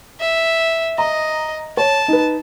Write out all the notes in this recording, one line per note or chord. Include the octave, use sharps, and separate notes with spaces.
E5
D#5 A#5
C#5 A5
D#4 B4